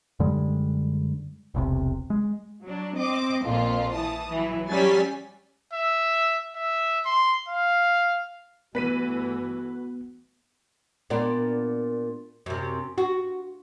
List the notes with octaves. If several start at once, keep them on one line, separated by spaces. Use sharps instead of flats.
F#2 D3 G3 G#3
E1 B1 C3
G#3
F#3 D4
C4 D#5 D6
A#1 F2 A#2 F4
E3 A5 D#6
E3 F#3
F#3 G3 C#4 G#5 A6 B6
E5
E5
C6
F5
G2 E3 A3 B3 F#4 B4 B6 D#7
A#2 B3 D4
F#2 C3
F#4